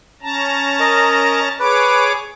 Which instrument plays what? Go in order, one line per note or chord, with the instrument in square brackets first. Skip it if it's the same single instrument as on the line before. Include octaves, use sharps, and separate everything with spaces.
[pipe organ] C#4 A5 A#5
[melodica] A#4 D#5
[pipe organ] G#4 C#5 D6 [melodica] B4